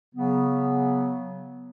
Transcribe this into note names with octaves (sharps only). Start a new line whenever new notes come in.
C#3 F#3 B3